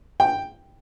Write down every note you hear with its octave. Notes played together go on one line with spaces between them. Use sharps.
G5